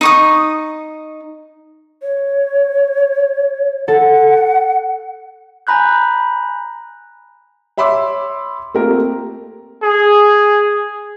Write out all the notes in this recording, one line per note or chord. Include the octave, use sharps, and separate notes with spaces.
D#4 C#6 D#6
C#5
A4 F#5
G#5 A#5 B5 F#6 G6
C#5 E5 B5 C6 D6 E6
A3 A#3 C4 F4 G4 A#4
G#4